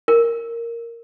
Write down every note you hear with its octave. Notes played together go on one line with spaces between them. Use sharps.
A#4